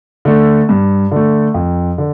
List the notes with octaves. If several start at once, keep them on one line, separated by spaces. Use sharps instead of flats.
D3 A3
G2
D3 A3
F2
D3